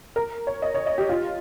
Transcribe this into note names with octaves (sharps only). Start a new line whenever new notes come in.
A#4
C#5
D#5
C#5
D#5
G4
F4